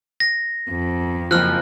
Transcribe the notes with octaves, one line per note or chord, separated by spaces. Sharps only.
A#6
F2
F#1 F3 F6 F#6